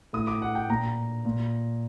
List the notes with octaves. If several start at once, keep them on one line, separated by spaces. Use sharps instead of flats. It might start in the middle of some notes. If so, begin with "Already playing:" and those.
A2 D#6
D6
F#5
G5
A#2 A#5
A#2